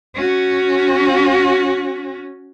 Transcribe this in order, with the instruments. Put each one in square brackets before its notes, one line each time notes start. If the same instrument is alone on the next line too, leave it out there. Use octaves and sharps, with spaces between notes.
[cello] C#4 F#4